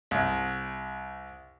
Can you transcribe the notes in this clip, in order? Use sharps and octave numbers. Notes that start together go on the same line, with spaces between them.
C2